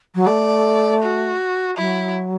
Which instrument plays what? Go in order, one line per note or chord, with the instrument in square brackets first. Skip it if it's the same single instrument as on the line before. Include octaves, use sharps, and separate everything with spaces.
[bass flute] F#3
[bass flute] A3 [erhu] D5
[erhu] F#4
[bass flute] F#3 [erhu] E4